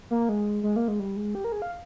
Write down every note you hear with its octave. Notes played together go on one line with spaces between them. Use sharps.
A#3
G#3
G#3
A#3
G#3
G3
G#3
G4
A#4
G#4
F5